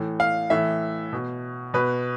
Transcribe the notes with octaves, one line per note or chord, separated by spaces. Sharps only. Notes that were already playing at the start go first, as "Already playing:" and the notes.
Already playing: A2 E3
F5
A2 E3 E5
B2
B2 B4